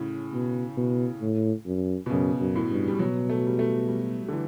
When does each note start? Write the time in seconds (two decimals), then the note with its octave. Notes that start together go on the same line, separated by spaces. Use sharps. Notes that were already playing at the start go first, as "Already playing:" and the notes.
Already playing: A2 C#3
0.33 B2
0.77 B2
1.21 A2
1.66 F#2
2.06 B2
2.10 F#2 C#3
2.40 F#2
2.56 A2
2.70 G2
2.88 G3
2.99 B2 F#3
3.29 A3
3.47 G3
3.59 A3
3.88 G3
4.28 D3
4.33 E3